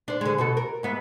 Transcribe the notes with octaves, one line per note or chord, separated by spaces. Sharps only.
D4 C5
D3 G#3
B2 F#4 A4
A#4
G#2 B3 E5